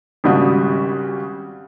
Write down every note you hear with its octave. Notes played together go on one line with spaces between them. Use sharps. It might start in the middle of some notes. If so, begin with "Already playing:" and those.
G#1 C#3 G3 F#4 D#6